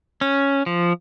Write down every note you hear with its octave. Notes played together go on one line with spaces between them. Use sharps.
C#4
F3